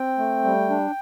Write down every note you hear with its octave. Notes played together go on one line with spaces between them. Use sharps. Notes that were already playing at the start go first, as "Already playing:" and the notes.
Already playing: C4 G5
A3
G3
D4